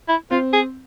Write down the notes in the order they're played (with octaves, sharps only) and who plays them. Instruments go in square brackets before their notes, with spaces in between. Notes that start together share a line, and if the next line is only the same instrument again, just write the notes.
[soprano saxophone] E4
[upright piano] C4 [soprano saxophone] F4
[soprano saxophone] G#4